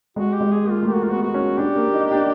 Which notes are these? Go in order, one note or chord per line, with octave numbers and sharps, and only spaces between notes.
G#3 F#4
G4
G#3
G#4
A#3
F4
A3
A#3 G4
F#4
A#3 F4
B3 F#4
F#4
C#4
D4 G4
A#3
D#4
D4